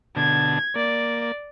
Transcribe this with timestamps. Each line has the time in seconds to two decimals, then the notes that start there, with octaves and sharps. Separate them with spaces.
0.16 B2 D3 A5 G#6
0.75 A#3 D5